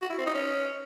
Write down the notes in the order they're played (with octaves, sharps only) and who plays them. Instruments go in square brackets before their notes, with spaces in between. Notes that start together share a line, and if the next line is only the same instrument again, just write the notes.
[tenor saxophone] F#4
E4
C4
D#4
C#4